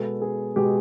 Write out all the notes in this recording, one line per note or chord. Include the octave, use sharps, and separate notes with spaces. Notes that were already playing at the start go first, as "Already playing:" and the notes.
Already playing: B2 G#3 B3 A4
G#4
B2 G#3 B3 G4